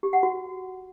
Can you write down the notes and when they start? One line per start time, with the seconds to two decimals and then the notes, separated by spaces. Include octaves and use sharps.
0.03 G4
0.13 F#5
0.23 F#4